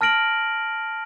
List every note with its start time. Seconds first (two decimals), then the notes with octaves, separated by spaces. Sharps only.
0.01 A5 F6 A#6 D7 F#7